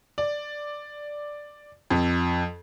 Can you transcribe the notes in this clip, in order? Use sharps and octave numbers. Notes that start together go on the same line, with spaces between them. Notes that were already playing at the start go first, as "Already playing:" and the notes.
D5
F2